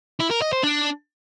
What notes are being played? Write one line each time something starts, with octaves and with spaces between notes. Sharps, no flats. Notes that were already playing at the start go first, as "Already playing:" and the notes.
E4
A#4
D#5
C5
D4